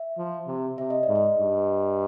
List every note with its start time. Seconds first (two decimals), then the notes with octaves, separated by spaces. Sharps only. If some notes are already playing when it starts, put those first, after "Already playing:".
Already playing: E5
0.17 F3
0.47 C3
0.78 C3 E5
0.90 D#5
1.03 G#2 D5
1.15 D#5
1.39 G2